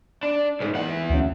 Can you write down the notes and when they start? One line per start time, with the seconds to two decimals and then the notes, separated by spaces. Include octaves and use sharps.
0.23 D4
0.60 C2 G#2
0.75 E3 F#5
1.10 D2 C#4